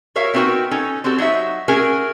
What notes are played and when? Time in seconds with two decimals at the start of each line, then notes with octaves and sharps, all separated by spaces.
0.16 F#4 A#4 C#5 E5 F5
0.34 B3 C4 D#4 F#4 A#4 G5
0.71 C#4 D#4 A4
1.04 C4 F#4 G4 A4
1.18 F#3 D#4 F#4 E5
1.68 A3 C#4 F#4 G#4 A#4